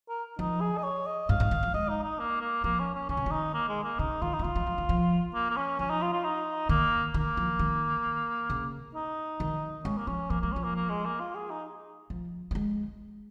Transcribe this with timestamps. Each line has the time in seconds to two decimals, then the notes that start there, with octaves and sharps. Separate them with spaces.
0.09 A#4
0.39 F3 D#4
0.61 G#4
0.77 D#5
0.84 C#5
1.06 D#5
1.29 G#2 F5
1.40 G#2
1.51 D#3
1.63 F3
1.74 G#3 D#5
1.89 D#4
2.03 D#4
2.19 A#3
2.41 A#3
2.64 F3 A#3
2.79 C#4
2.94 C#4
3.09 D#3 C#4
3.17 C#3
3.26 D#3
3.32 D#4
3.54 A#3
3.69 G#3
3.84 A#3
3.99 C#3 D#4
4.22 D#3 F4
4.34 D#4
4.39 F3
4.44 D#3 F4
4.56 F3
4.66 F3
4.78 D#3
4.89 F3
5.34 A#3
5.51 A#3
5.56 C#4
5.79 F3 C#4
5.90 D#4
6.02 F4
6.13 F4
6.24 D#4
6.69 D#3 A#3
7.14 D#3 A#3
7.37 F3
7.59 D#3
8.50 C#3
8.95 D#4
9.40 D#3
9.84 G#3 C#4
9.97 A#3
10.07 F3 C#4
10.30 F3 A#3
10.41 G#3 A#3
10.52 F3 C#4
10.64 A#3
10.75 A#3
10.90 G#3
11.05 A#3
11.20 F4
11.35 G#4
11.50 D#4
12.10 F3
12.51 F3
12.55 G#3